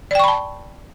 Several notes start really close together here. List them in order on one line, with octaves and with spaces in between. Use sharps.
D5 G5 C#6 B5 A5